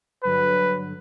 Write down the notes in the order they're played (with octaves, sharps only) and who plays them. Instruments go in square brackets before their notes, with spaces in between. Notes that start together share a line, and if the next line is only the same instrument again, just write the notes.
[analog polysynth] G2 D3 F#3 [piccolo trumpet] B4